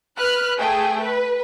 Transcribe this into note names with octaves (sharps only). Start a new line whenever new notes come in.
B4 F6 F#6
A3 G#4 G5
B4